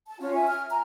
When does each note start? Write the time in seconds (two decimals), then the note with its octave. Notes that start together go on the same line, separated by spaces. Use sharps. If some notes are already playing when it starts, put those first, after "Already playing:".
0.07 A5
0.20 C#4 F4 F#4 C#5
0.34 E5 G#5
0.48 F6
0.69 G#5 A#5